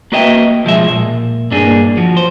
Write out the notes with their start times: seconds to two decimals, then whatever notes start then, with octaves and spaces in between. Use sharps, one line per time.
0.12 A#3 F#4 B4 D#5 E5 G5
0.65 B1 F3 G#3 E5
0.90 A#2
1.51 G2 A#3 D4 G#4
1.97 F3 F#4
2.17 C5